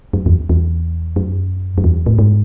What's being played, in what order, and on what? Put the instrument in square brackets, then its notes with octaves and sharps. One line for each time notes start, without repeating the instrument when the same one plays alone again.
[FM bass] F#2
E2
E2
F#2
F#2
E2
A2
G#2